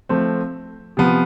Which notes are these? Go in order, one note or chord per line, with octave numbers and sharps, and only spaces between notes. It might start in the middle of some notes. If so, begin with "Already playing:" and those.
F3 A3 C4
C3 F3 B3